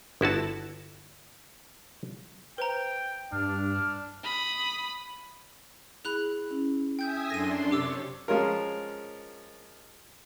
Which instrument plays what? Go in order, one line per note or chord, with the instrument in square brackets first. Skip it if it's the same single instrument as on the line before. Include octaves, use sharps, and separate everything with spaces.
[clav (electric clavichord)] G1 E4 F#4 A5
[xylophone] B4 C5 A#5 [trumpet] G5
[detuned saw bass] G2 [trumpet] D4 [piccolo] F6
[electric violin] B5 D#6
[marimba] E4 G#4 [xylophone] B5 F#6 F7
[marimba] C#4 E4
[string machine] E5 G#5 D#6 [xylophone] G5 G6
[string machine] F#2 D4 C6 [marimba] A4 [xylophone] A#6 D#7
[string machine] C3 C#5 [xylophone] G4 D6 E6
[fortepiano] F3 G#3 C#4 F4 A#4